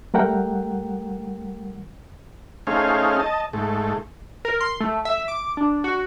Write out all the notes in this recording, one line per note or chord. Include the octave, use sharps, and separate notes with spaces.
G3 A3 A#4 F#5 G5
A3 C#4 D#4 G#4 C5 F5
D#5 A5
G#2 A3
A#4
C6
A3
E5
D6
D4
F#4